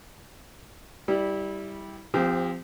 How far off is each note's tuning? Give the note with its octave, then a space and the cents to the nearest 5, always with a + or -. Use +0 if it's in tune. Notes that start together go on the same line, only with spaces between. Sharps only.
G3 +0 E4 -20
F3 +0 C4 -20 G4 +35